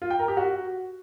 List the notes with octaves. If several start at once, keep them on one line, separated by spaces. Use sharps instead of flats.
F4
G5
A#4
G4
F#4